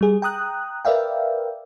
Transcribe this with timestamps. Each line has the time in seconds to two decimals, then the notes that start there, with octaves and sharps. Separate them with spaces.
0.01 G3 G#4
0.22 G5 A#5 D#6 F#6
0.85 A#4 B4 D5 E5 F5 G5